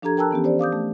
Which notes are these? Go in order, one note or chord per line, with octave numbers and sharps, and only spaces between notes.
F3 D4 G4 A4 A#5 G#6
A#4 G5 A5 A#5 E6 F#6
E3 B3 C#4 G4
G4 C5 D5
F5 D6 D#6 G6
A3